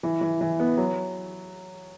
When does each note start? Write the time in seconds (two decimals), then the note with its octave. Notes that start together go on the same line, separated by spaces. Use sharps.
0.03 E3
0.21 E3
0.41 E3
0.60 B3
0.77 F#3